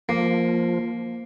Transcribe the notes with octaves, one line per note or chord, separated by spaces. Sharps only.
F3 A#3